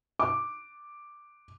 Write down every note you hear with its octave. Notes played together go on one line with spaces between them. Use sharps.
D6